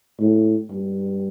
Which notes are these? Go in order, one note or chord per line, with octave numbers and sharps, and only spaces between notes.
A2
G2